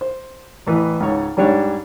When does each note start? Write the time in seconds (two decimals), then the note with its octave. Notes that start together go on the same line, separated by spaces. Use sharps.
0.01 C5
0.67 A1 E3 B4
1.00 C#2 G#2 C#5
1.37 G#2 G3 D4 C#5